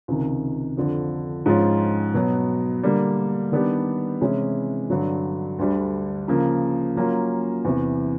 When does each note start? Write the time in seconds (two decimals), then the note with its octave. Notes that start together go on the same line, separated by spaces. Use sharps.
0.08 C#2 C3 D#3
0.77 F2 D3 F3
1.46 G#2 F3 G#3 C#4 F4
2.14 B2 F#3 B3
2.83 D3 G3 A#3
3.52 D#3 G3 B3 D4 G4
4.21 C3 E3 G#3 C#4 E4
4.90 G2 D3 F#3
5.59 D2 D3 G3
6.28 C#3 F3 A#3
6.96 F#3 A#3 C#4 F4
7.65 E2 C3 E3